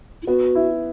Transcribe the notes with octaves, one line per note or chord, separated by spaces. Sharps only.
E4
B3 F#4
E4